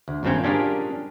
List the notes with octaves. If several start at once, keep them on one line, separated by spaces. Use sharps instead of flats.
D2
G#1 G2 A#2 C4 C#4 G5
C#4 D4 F4 G4 G#4 A#4